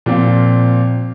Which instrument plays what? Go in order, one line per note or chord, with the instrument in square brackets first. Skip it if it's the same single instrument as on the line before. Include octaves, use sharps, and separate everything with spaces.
[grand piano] A#2 F3 C4 F5